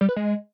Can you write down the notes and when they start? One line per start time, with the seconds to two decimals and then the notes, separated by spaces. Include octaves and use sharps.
0.01 G3
0.09 B4
0.16 G#3